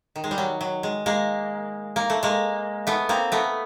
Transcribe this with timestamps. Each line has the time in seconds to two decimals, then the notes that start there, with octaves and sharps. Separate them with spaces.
0.16 D#3
0.24 G#3
0.31 G3
0.38 F#3
0.61 F#3
0.83 G#3
1.06 G#3 A#3
1.96 A#3
2.10 A3
2.23 G#3 A#3
2.87 A3 B3
3.09 A#3 C4
3.32 A3 B3